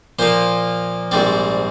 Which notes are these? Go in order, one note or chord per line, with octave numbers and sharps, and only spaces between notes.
A#2 F3 A#3 C5
A#1 G#2 G3 C4 D5